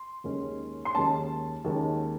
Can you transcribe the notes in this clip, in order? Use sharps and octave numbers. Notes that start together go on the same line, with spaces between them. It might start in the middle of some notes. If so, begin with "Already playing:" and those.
Already playing: C6
D#2 D#3 G#3 C#4
C6
D#2 D#3 G#3 C#4 A5
D#2 D#3 G#3 C#4